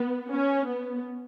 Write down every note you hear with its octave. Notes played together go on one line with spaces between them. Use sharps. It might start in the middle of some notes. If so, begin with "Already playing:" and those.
Already playing: B3
C#4
B3